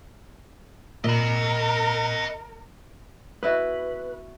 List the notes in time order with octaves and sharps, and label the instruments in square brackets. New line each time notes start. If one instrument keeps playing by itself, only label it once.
[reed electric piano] A#2 [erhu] A#4 [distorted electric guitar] D#5 B5
[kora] B3 E4 F#4 [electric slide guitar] B4